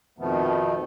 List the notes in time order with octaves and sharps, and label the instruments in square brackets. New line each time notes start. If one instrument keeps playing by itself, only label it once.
[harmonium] F2 B2 D#3 F3 A3 B3